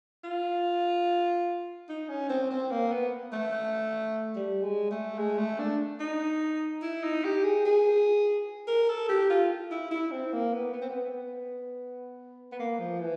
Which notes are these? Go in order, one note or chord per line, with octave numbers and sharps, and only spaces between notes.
F4
D#4
C#4
C4
C4
A#3
B3
A3
G3
G#3
A3
G#3
A3
D4
D#4
E4
D#4
G4
G#4
G#4
A#4
A4
G4
F4
E4
E4
C4
A#3
B3
B3
C4
B3
B3
A#3
F3
E3